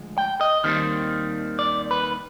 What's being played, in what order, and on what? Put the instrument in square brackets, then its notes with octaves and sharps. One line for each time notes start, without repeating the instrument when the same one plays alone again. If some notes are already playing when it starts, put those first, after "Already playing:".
Already playing: [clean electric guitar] D2 F3 G#3
G5
D#5
D#2 D#3 G3 C4
D5
B4